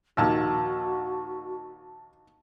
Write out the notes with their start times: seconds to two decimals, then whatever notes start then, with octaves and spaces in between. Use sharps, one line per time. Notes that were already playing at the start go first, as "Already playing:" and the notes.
0.17 A#1 D#2 F#4 A5 E6